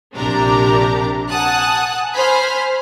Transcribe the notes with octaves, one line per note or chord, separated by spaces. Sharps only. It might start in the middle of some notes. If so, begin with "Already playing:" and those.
A#1 C3 D4 G4 A#4 A#5
F#5 G#5 A5 D#6 F#6
C5 G#5 B5 F6